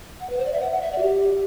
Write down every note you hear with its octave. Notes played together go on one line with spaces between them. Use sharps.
F#5
B4
C5
D5
E5
F#5
F#5
E5
D5
F#4
G4